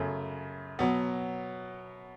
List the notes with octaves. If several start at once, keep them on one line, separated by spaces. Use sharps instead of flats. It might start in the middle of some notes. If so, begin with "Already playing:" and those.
Already playing: F#2 C#3 A3
B2 F#3 B3